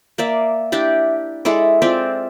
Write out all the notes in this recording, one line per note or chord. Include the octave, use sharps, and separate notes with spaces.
A#3 D5 E5
D4 E4 G4 D5
G#3 E4 A4 D5
C4 F4 D5 E5